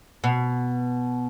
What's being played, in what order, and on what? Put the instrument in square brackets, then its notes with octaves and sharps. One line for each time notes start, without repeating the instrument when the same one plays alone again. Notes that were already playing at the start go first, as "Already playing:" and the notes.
[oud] B2